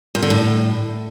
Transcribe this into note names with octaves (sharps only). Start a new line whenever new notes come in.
A#2
D3
A2